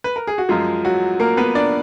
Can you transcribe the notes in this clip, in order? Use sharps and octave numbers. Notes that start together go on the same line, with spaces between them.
B4
A#4
G#4
F#4
F#2 F3 G#3 F4
F#3 F#4
A#3 A#4
B3 B4
D4 D5